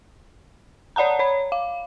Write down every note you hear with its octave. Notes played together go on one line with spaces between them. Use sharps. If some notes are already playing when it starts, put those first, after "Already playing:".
C#5 D5 F#5 A5 A#5
C#5 B5
F5